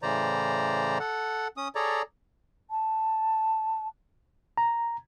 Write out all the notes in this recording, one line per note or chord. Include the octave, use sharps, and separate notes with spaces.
A2 C#3 E3 C5 D5 A#5
A4 F#5
C#4 D#6
G#4 A4 C#5 D5 A#5
A5
A#5